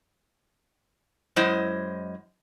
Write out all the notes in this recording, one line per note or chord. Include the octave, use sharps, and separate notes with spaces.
F#2 G#3 E4 C5 D#5